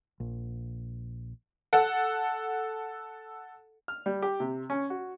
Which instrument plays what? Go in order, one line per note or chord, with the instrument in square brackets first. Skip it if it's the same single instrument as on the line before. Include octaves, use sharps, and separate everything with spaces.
[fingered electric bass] A#1
[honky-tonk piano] A4 F#5
[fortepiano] F6
G3
G4
C3
C#4
F#4